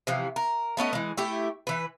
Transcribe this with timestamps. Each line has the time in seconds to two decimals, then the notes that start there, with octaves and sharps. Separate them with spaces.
0.07 C3 E3 F3
0.36 A#4
0.77 A3 B3 C#4 D#5
0.93 E3 G#3
1.17 A3 E4 G4
1.67 E3 B4